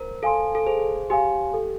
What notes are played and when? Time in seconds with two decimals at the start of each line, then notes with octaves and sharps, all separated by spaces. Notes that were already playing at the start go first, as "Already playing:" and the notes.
Already playing: A#4 C5
0.23 A4 F5 G#5 C6
0.55 A4
0.66 G#4 C5
1.10 G4 F5 G#5 C6
1.53 A4